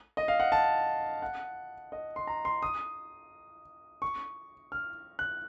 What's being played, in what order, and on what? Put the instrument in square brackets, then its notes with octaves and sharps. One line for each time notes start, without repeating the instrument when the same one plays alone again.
[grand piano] D#5
F5
F#5
A5
F#5
D#5
C6
A#5
C6
D#6
C#6
F6
F#6